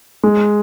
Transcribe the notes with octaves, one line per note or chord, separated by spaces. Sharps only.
G#3